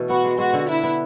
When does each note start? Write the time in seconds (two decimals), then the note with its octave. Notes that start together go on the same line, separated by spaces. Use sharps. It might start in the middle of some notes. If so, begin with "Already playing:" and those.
Already playing: B2 E3 A3
0.09 B3 F#4
0.24 G#3
0.38 G#3 F#4
0.53 D3
0.69 D4 E4
0.83 B3